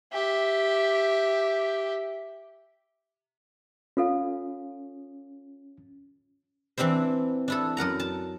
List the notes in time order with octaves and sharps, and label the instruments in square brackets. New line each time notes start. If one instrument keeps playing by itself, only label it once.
[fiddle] G4 E5
[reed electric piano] C#4 [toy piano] F4 A4 F5
[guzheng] E3 C4 D4 E4 C5
D4 E4 A4
F#2 A#4 F#5 A#5
A5